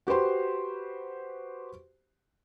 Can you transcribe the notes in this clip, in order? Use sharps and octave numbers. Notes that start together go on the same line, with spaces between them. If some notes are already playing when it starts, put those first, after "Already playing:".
F#4 G4 B4 C5 C6